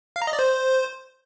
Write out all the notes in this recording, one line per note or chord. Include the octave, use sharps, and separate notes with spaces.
F5
A#5
D#5
D5
C5